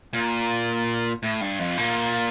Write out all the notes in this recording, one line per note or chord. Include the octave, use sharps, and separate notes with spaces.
A#2
A2
G2
F2
A#2